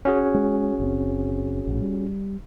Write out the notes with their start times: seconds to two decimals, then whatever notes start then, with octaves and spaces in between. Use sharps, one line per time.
0.05 C#4 F#4 G#4
0.34 G#3
0.80 F#1 C4
1.67 A#1 A2
1.82 G3